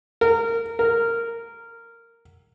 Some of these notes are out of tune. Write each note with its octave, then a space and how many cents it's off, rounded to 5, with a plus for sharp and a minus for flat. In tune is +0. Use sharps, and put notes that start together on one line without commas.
A#4 -20
A#4 -10